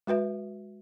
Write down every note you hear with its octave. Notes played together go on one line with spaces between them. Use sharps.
G#3 F#4 B4 E5